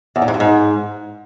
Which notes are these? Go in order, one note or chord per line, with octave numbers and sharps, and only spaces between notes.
E2
A#2
G#2
G2
G#2